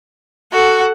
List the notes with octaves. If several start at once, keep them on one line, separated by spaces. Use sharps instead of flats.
F#4 A4 F#5